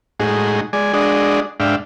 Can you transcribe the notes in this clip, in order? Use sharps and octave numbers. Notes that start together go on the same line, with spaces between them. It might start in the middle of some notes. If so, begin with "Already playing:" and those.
A2 G#3 D#4 F#4 G#4
G#3 D5 G#5
G#3 D4 F#4 G#4 D5 D#5
G#2 D4 E5 F5 G5